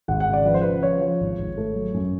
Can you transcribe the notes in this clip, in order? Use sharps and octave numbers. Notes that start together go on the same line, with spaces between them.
G#1 F#5
F#5
C#3
D5
F3 B4
C5
C#3 B4
F3 C#5
F3
G#1
G#1
A3
F#3
F#2